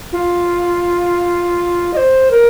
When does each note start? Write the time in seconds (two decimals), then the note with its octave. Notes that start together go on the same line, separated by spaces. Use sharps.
0.13 F4
1.93 D#5
1.97 C5
2.31 A#4